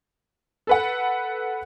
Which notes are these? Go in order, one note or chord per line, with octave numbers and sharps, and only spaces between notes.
A4 B4 F#5